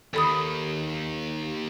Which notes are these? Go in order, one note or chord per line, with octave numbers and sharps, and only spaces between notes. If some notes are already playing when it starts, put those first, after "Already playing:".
D#2 D#3 A4 B5 D#6